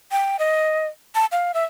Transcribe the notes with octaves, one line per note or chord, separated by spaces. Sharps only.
G5
D#5
A5
F5
E5